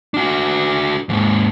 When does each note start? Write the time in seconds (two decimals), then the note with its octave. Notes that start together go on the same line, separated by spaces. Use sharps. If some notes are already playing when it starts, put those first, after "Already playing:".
0.14 D4 F#4
1.09 D#2 G#2